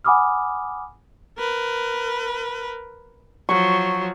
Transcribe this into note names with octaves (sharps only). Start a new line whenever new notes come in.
F#5 G#5 B5 D6 D#6 F6
A#4 B4
F3 F#3 C#6